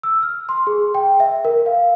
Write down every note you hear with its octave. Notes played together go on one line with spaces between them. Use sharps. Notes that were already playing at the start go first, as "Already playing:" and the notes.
E6
F6
C6
G#4
G5
E5
A#4
F5